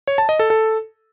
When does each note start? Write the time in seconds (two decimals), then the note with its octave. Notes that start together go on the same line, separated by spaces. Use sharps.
0.07 C#5
0.18 A5
0.29 D#5
0.39 A4
0.50 A4